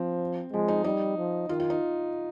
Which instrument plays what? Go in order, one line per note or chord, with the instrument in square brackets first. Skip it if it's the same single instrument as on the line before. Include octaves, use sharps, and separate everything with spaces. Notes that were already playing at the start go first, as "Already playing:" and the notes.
Already playing: [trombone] F3 [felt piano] C4
[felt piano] F3 [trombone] G#3
[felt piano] D#4
[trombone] G3 [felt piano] D#4
[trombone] F3
[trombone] D#3 [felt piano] F4
[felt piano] F4
D#4